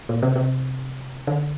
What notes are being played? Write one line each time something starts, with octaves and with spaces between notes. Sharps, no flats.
A#2
C3
C3
D3